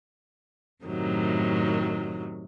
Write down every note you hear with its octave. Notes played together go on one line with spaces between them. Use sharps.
F#2 A2 C3 D#3 F#3